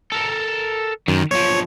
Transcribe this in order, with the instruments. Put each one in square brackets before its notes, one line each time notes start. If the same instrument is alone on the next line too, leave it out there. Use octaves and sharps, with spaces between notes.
[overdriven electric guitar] A4 A#4
[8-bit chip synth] F#2 [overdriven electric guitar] D#3
[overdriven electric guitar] B1 F3 [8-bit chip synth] C#5